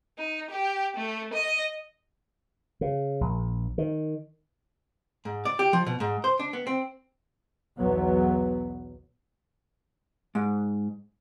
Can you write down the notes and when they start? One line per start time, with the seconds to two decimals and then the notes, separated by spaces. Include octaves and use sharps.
0.18 D#4
0.50 G4
0.97 A3
1.33 D#5
2.81 C#3
3.21 A#1
3.78 D#3
5.25 G#2
5.45 D5
5.59 G4
5.73 F3
5.87 B2
6.00 G#2
6.24 C5
6.39 D4
6.53 B3
6.67 C4
7.78 B1 E2 F#3 B3
10.35 G#2